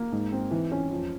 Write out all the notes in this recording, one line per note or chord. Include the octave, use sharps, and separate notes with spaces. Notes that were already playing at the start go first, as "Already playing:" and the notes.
Already playing: A#3
G#2
C4
E3
C#4
F2